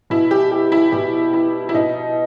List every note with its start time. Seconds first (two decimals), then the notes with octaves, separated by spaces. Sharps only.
0.10 B2 E4
0.31 G4
0.51 G4
0.72 E4
0.92 B2 G4
1.34 E4
1.69 E4
1.74 B2 D#4